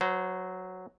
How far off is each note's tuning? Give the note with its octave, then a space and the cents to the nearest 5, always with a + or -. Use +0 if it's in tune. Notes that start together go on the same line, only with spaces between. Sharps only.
F#3 +0 C5 -25